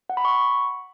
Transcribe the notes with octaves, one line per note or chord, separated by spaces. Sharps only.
F#5
B5
C#6